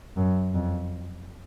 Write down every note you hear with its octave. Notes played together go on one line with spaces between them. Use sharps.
F#2
F2